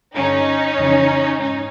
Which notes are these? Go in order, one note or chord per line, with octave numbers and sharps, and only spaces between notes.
G2 D3 C#4 D#4
F2 C#3 E3
G#2 C#4 D#4